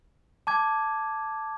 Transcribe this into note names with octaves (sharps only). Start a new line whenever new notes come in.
A5 D6 G#6